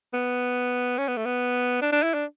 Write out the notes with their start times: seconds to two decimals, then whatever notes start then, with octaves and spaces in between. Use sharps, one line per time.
0.14 B3
0.98 C#4
1.08 B3
1.17 A3
1.26 B3
1.82 D4
1.92 D4
2.03 E4
2.14 D4